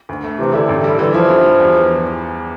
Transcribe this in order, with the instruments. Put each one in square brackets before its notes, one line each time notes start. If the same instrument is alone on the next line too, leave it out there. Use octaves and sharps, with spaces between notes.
[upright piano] D2
A3
[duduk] C3 [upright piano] E3
[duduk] D3 [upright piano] E4
[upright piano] A1
G3
[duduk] D3 [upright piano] E3
[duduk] F3 [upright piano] E4
[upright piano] G2
G3
E2
E3